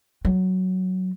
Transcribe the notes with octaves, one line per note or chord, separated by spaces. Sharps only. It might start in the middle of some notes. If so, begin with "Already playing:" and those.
F#3